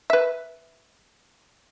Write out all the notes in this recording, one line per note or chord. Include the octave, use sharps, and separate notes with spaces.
B4 E5